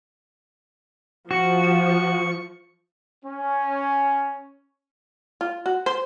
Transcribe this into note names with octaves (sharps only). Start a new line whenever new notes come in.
F3 F#4 C#6
C#4
F4
F#4
C5